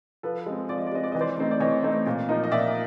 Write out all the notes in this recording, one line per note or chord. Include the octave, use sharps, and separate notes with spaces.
F3 A4 B4
G#3 C4
F3 D5
D#5
D5
G#3 C4 D#5
D5
E3 D#5
C5 D5
A3 C4 D#4
D5
E3 C#5 D#5
A3 C4 D#4
A#2
F3 A#3 D#4
D#5
A#2 D5 E5